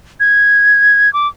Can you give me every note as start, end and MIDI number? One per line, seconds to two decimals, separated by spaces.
0.20 1.12 92
1.13 1.28 86